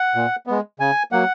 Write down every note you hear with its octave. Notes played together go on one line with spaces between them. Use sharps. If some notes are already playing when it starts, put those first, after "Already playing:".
Already playing: F#5
A#2
G#3 B3
C#3 G#5
F#3 A#3 F#5